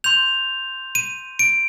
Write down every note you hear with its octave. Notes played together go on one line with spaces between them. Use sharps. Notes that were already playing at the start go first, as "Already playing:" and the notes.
C6 G6 F7
D#7
D7